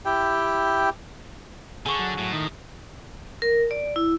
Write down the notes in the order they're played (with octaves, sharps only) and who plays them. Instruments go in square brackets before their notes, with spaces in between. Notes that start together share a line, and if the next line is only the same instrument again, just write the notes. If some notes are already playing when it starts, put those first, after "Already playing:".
[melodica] E4 G4 G5
[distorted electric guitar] D3 [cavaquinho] G#4 C#6
[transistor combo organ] F#3
[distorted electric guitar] A2
[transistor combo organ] D#3
[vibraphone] A#4
D5
E4